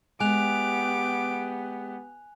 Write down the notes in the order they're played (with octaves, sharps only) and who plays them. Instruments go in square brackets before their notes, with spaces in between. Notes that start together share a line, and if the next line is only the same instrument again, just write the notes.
[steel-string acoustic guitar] G#3 [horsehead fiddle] B3 G4 [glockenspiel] G#5 F#6 F7 [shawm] D6